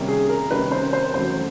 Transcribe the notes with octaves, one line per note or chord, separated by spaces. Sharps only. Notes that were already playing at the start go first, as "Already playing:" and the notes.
Already playing: C3 D#3 G3 A#3 C#4
G#4
A#4
C3 D#3 G3 A#3 C#4 B4
C5
C5
E2 C#3 F#3 A3 C5